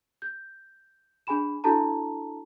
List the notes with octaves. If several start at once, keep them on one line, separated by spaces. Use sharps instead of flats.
G6
D4 G#4 G#5 B5 E7
D4 E4 F#4 A4 A5 A#5